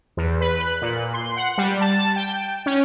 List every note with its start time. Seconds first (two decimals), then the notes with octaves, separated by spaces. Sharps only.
0.17 E2
0.41 B4
0.61 F#6
0.82 A#2
1.14 C6
1.37 F#5
1.58 G3
1.81 A5
2.16 G5
2.66 C#4